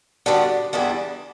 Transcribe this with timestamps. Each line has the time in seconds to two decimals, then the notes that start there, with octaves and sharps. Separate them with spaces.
0.26 D3 G3 B3 D4 F#4
0.73 E2 D3 G3 B3 E4